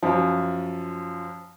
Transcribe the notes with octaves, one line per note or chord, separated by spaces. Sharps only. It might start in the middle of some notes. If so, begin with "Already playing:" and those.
F#2 F3